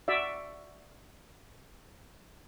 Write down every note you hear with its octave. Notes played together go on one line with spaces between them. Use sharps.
F#4 D5 E5